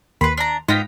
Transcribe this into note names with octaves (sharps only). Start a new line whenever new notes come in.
D#2 B4 B5 C6
D4 A#5
G#2 B3 F4 G5 A#6 B6